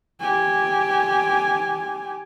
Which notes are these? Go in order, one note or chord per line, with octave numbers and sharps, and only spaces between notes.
G4 G#5